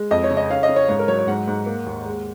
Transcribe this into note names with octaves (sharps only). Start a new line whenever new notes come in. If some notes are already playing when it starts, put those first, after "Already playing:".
Already playing: G#3
F2 D#5
C#5
C#3
D#5
C#4 F5
D#5
C#4
C#5
G#2 C#5
A#4
F#3 C#5
C#5
G#2 F#5
G#2
A#3
D#2
G#3